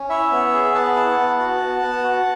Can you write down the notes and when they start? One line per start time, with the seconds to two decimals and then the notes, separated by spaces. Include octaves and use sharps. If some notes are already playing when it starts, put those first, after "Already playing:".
Already playing: C#4
0.09 E4 C#5 E5
0.32 B3
0.54 G#4
0.74 B3 F#5 A5
0.96 E4
1.18 B3
1.39 F#4
1.61 B3
1.83 B3
2.04 F#4